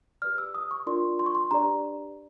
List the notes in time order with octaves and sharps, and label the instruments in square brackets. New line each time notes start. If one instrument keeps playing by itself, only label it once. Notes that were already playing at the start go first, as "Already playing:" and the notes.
[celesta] G4 B4 D5 F6
E6
D#6
C#6
D4 F4 A#4 D5 C6
C6
C#6
C6
D4 G4 B4 D5 A#5